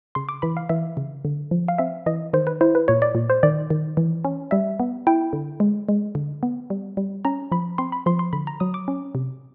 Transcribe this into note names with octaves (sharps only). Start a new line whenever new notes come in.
C#3 C6
D6
E3 B5
F5
E3 E5
C#3
D3
F3
F5
C4 E5
E3 D#5
D#3 C5
B4
E4 C5
B4
A#2 C#5
D5
A#2
C5
D#3 D5
D#3
E3
C#4
G3 E5
B3
E4 G5
D3
G#3
G#3
D3
B3
G3
G3
C#4 A#5
F3 B5
C4 C6
B5
F3 C6
C6
D3 B5
A#5
F#3 D#6
D6
C#4
C3